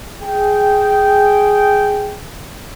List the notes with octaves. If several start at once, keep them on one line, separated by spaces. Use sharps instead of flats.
G#4 G5